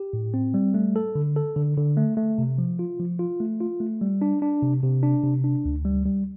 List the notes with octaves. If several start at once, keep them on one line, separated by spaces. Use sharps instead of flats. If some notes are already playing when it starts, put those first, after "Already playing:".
Already playing: G4
A2
C4
G3
A3
A4
D3
A4
D3
D3
A3
A3
C3
F3
F4
F3
F4
A3
F4
A3
G3
D4
D4
C3
C3
D4
C3
D4
D2
G3
G3